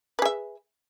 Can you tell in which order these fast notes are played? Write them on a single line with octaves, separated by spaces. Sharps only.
B4 G#4 E5